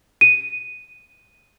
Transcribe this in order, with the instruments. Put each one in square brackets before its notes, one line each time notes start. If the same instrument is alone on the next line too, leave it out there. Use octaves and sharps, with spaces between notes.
[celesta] D#7